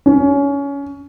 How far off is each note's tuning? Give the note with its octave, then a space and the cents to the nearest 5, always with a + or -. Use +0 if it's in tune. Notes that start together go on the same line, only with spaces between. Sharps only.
C#4 +20